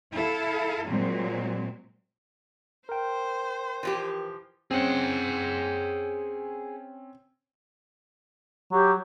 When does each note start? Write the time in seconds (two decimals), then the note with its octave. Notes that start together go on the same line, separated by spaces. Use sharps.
0.14 E4 A4 F5
0.89 A#2 F#3 G#3 C4
2.89 A#4 C5 G5
3.83 E3 F3 G4
4.71 C4 C#4 G#4 F#5
8.72 F#3 G4